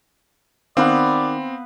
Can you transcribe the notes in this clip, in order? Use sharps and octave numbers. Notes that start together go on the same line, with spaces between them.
D#3 B3 C4 B4 D5 F5